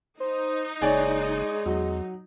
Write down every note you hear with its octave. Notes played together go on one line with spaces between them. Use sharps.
D#4 C5
F#1 G#3 C#5 D5 G#5
E2 F#3